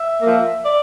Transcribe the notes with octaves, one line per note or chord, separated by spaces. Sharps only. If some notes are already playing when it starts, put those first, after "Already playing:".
Already playing: E5
F3 A#3
D5